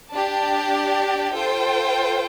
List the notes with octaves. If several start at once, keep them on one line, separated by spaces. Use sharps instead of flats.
D4 G4 D5 A5
F4 A4 C5 G5